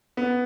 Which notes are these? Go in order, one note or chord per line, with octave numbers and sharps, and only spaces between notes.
B3